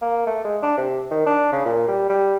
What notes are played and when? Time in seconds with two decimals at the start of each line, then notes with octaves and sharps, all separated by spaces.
0.02 A#3
0.27 A3
0.45 G#3
0.63 D4
0.78 C3
1.11 D#3
1.26 D4
1.53 C#3
1.65 A#2
1.88 G3
2.10 G3